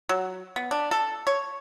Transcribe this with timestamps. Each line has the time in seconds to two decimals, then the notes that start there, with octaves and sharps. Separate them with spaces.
0.09 F#3
0.56 B3
0.71 D4
0.91 A4
1.27 C#5